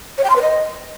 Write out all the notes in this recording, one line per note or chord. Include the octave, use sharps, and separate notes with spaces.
C#5
G5
C6
B4
D#5